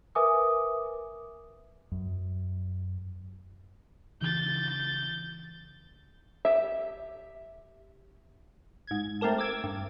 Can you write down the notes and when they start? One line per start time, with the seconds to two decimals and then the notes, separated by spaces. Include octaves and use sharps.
0.15 A#4 B4 E5 G#5 D6 D#6
1.92 F#2
4.21 C#3 E3 G6 A6
6.45 G4 E5
8.87 G#2 G#6
9.21 A3 C4 G4 A#4 A5
9.38 D6 E6 G#6
9.64 G2